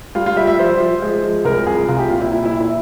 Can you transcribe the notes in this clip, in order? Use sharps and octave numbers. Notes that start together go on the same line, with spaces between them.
G3 F4
F4
G3 E5
E5
F3 C5
F3
G#3
F3
C2 A#4
C2 G#4
C2 F4
G4
A#2 F4
E4
A#2 E4
E4
A#2
E4